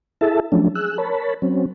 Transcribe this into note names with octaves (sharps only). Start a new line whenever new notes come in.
E4 G#4 A4 E5 A5
F3 F#3 A3 C#4 D4
G#4 E6 F#6
A#4 C#5 A5 B5
F#3 C4 C#4